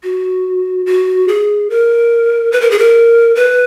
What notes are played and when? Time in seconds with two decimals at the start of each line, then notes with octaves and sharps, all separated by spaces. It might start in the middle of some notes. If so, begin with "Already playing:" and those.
0.03 F#4
0.86 F#4
1.28 G#4
1.70 A#4
2.52 B4
2.61 A#4
2.71 G#4
2.79 A#4
3.35 B4